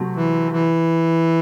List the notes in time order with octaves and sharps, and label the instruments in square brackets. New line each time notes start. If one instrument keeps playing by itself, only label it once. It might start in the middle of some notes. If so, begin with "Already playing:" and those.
Already playing: [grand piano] C3 F#3 A3
[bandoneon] E3
E3